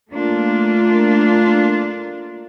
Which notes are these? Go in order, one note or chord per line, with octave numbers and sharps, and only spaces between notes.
A3 A#3 D4 F4